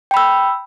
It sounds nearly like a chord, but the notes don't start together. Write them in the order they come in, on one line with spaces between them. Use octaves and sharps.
G5 B5 E6